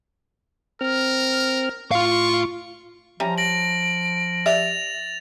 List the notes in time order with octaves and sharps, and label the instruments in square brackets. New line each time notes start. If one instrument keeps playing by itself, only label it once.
[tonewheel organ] C4 F6 [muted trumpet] A#4
[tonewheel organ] A2 D6 [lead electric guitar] F4 F5 [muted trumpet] C#6
[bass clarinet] F3 [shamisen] G3 C#4 E4 [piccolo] A#5
[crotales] A#6 F#7 [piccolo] D7
[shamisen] G4 D5 E5 [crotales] A6 F7